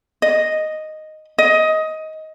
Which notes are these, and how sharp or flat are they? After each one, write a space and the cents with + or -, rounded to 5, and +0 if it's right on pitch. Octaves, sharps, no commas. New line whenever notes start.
D#5 +0
D#5 +15